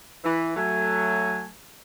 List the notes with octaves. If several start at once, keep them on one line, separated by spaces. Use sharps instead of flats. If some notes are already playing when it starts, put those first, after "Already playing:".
E3
F#3 A3 G#5